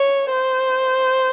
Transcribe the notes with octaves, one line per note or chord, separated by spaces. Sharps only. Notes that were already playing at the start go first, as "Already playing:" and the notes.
Already playing: C#5
C5